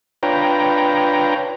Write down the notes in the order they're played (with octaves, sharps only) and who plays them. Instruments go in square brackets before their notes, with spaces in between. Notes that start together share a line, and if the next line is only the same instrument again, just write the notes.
[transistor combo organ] D4 F4 B4 C#5 G5 A#5